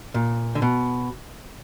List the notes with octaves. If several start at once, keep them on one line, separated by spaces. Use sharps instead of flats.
A#2
D3
B2